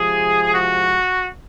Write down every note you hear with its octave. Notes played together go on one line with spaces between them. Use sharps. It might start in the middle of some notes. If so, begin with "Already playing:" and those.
Already playing: C3 F3 G#3 G#4
F#4